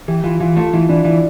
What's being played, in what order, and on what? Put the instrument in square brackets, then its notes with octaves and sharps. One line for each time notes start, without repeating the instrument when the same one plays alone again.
[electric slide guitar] E3 [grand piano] G4
[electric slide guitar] E3 [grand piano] F4
[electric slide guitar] E3 [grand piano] F4
[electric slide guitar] A3 [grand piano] F4
[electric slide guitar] E3 [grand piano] E4
[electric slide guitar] E3 [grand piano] D4
[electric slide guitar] E3 [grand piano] E4